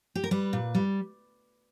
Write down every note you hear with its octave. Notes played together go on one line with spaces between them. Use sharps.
G4
A#4
G3 B4
A#2
G3